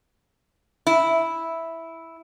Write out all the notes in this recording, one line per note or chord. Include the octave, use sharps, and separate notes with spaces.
E4